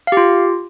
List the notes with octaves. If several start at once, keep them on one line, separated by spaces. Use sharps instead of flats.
F4 G4 F5